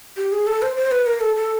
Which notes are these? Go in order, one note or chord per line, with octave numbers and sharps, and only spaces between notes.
G4
G#4
A4
C5
C5
B4
A#4
A4
A4